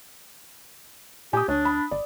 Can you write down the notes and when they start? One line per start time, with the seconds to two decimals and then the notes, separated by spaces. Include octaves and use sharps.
1.33 A#2 G4 G#5 D#6
1.48 D2 D4 C#5
1.65 B5
1.91 G#1 D5